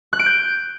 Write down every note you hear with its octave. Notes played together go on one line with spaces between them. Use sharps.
F#6
D7
G6